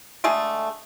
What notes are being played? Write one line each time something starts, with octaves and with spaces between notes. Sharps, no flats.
D3 G#3 A3 G#4